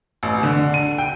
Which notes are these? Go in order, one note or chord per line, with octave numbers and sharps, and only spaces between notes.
A1
D3
D#7
G5